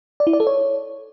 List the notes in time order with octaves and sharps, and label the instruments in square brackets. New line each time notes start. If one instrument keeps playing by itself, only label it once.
[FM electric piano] D5
E4
D5
A4
C#5